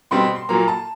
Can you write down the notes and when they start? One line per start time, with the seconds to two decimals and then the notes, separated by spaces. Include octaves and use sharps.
0.11 B2 G3 C4 C6
0.24 C6
0.36 C6
0.49 A#2 F#3 A#3 A#5
0.68 A5